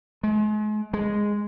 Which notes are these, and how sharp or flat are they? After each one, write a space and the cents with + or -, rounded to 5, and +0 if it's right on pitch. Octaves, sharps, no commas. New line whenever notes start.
G#3 +40
G#3 -5